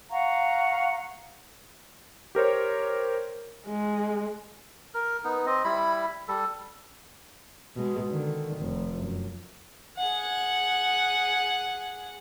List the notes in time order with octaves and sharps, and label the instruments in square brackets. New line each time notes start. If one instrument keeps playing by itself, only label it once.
[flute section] F5 F#5 A#5 C#6
[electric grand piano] G4 A#4 C5 C#5
[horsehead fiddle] G#3
[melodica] A#4
B3 D#4
C4 D#5
G3 E4 B5
G3 A4
[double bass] B2 G#3
D3 D#3
F1
F#2
[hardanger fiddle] G#4 F#5